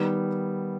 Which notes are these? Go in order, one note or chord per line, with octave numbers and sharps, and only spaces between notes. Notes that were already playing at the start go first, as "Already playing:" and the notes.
Already playing: D#3 G3 B3